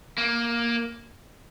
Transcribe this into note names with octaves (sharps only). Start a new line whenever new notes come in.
A#3